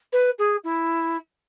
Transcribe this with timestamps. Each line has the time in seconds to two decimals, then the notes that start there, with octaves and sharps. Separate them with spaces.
0.13 B4
0.39 G#4
0.64 E4